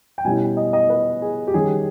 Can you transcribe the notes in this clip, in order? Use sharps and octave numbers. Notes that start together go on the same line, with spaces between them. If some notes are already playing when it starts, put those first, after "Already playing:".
G5
B2 G3 C#4 E4 G#5
D#5
D#5
B4
G#4
G4
D#3 G3 C#4 G#4